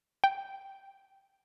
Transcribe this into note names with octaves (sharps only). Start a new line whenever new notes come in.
G5